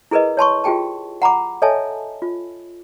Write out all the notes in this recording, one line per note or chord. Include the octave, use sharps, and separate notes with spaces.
E4 G#4 A#4 B4 D#5
C#5 A5 C6 C#6
F4 G4 G#4 G5 A5
F#5 A#5 B5 D6
A4 C#5 D#5 E5 G#5 A5
F4